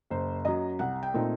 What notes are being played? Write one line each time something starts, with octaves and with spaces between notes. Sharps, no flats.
F#1 C5
F#2 F#3 D#5
C2 F#5
G5
A#2 A3 C4 D#4